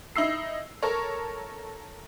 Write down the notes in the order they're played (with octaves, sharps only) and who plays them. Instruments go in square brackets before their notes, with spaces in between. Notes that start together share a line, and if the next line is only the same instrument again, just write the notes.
[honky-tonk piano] D#4 E4 E6 C7
A4 A#4 C#5